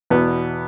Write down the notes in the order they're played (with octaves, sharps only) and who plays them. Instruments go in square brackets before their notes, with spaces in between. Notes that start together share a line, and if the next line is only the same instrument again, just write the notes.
[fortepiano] E2 B2 B3